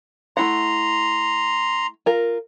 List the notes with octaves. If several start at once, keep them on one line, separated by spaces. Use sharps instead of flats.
A3 E4 F#5 A#5 C6
F4 A#4